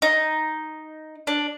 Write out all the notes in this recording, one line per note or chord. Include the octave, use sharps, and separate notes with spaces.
D#4
D4